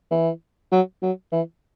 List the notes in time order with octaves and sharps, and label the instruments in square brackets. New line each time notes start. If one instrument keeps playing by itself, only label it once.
[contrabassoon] E3
F#3
F#3
E3